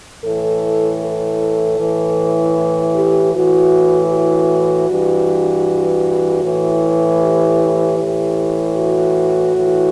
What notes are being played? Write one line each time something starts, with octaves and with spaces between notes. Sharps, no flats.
A2 E3 A4
A4
A2 E3
G4
A2 E3 F#4
F#4
G2 E3
A2 E3
G4
A2 E3
F#4
A2 E3